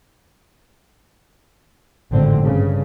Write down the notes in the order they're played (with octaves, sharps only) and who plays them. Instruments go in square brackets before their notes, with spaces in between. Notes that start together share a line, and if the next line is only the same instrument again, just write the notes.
[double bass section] G#1 F2 A2 D3 C4
G2 C#3